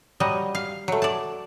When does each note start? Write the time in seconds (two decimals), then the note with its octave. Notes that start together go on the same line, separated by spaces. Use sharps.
0.20 F#3 G3 D#5
0.55 F5
0.88 F#3 A3
1.02 D5 A5